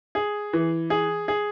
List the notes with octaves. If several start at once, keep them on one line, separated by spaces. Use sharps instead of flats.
G#4
E3
G#4
G#4